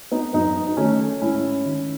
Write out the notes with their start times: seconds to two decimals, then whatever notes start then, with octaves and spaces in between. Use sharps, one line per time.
0.11 B3 D#4
0.33 F#2 B3 D#4
0.67 D#4
0.77 D#3 A3 C#4
1.21 G#2 C#4 E4
1.65 D#3